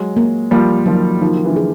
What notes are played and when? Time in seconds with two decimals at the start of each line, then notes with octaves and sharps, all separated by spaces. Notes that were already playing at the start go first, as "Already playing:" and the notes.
Already playing: F#3 G#3
0.17 A#3
0.51 F3 G3 A#3
0.86 D#3 F3 F#3
1.21 D#3 F3 D#4
1.36 D#3
1.44 D3 E3
1.56 G#4